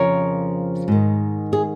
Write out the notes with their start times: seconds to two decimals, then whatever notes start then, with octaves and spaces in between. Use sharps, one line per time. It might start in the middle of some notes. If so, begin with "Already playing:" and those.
Already playing: F2 C#3 F3 A#4 C#5
0.88 G#2 D#3
1.53 G#4